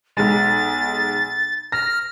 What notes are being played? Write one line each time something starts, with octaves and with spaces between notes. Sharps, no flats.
B1 G#3 A6
F6 A#6